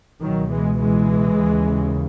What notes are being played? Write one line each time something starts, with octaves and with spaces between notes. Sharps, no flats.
C#2 B2 D#3 F#3
E3 G#3
E3 G#3
D#2 C#3